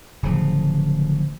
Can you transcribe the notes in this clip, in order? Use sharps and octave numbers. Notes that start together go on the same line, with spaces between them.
D1 C#3 F3